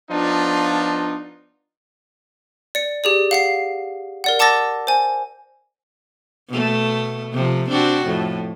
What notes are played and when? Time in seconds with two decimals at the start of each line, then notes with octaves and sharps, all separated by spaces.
0.11 F3 B3 D4 D#4 F4
2.75 D5 C#7
3.04 G4 G#4 D5
3.31 F5 F#5 C7
4.24 A#4 D5 F#5
4.39 F#5 A5 D6 E6 A6 A#6
4.87 C5 G#5
6.49 B2 A3
7.32 C3 F3
7.69 C4 D4 F#4
8.05 F2 A2